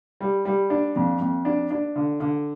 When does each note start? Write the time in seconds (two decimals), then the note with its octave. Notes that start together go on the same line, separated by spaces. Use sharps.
0.21 G3
0.45 G3
0.70 D4
0.96 F2
1.21 F2
1.45 D4
1.70 D4
1.96 D3
2.20 D3